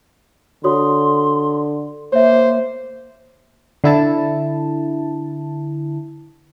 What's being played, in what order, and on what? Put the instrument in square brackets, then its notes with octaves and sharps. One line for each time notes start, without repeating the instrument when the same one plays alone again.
[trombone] D3 [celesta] F#4 C#5 D#6 [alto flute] C6
[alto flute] A#3 [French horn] C5 [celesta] C#5 E5
[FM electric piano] D3 E4 A5